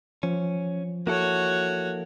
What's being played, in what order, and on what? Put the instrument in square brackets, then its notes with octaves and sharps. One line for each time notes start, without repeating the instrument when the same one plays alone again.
[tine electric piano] F3 [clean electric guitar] C#4
[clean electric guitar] A#3 E4 A4 [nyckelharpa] F#4 C#5